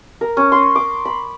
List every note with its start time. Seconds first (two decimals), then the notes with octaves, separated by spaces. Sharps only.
0.21 A#4
0.37 C#4
0.52 C6
0.76 D6
1.05 B5